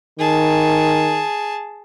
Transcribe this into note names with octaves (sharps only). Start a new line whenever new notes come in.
D#3 G#4 A5